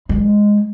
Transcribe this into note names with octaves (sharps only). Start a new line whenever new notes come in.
G#3